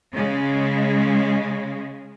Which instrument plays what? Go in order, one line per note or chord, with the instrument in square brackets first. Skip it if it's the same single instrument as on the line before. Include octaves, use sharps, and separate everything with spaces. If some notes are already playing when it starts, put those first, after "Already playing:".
[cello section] C#3 G#3